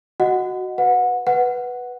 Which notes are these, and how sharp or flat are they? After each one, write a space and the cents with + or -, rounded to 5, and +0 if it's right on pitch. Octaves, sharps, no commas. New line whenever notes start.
F#4 +0 D#5 +0 F#5 +0
B4 -5 F#5 -25
B4 +0 F#5 +0